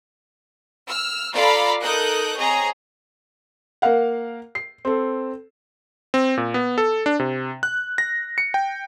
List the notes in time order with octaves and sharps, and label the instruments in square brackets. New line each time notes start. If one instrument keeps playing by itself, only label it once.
[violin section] E6 F6
F4 A4 D5 F5 A#5 B5
D#4 A4 A#4 D#6 F#6 G6
C4 G#4 C#5 D#5 A#5
[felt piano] A#3 A#4 F5 F#5
C7
C4 A4
[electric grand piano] C4
A#2
B3
A4
D4
C3
F#6
A#6
C#7
G5